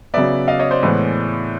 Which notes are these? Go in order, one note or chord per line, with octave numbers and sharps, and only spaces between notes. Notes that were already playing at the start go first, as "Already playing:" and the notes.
C#3 F#3 B3 D5 E5
D#5 F5
C#5 D#5
C5 D5
A2 E3 G#3 B3